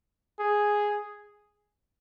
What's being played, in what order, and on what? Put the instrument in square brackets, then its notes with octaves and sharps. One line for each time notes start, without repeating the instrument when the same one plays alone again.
[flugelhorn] G#4